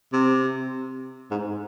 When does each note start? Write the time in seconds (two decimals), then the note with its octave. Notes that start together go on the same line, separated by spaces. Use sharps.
0.13 C3
1.31 G#2